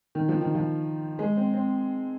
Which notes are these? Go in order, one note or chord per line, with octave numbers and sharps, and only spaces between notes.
D#3
F3
D#3
F3
G#3
C4
C4